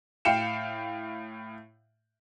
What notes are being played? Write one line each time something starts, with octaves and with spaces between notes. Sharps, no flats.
A2 F5 G5 C#7 E7